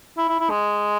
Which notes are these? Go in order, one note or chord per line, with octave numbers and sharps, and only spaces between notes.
E4
E4
E4
G#3